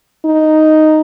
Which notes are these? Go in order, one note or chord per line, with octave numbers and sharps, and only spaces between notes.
D#4